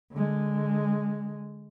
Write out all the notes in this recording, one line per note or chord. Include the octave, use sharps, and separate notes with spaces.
D3 G#3